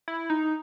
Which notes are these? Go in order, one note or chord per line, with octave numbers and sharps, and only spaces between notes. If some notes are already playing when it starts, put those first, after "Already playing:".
E4
D#4